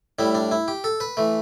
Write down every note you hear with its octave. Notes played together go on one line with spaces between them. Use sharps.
A2 G3 E4
D4
E4
G4
A4
B4
E3 A3